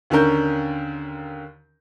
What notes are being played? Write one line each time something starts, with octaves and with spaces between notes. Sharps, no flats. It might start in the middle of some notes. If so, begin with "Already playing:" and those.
D#2 D3 C#4 A#4 G6